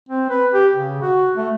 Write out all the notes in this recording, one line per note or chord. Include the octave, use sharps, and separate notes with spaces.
C4
B4
G4
C#3
F#4
A3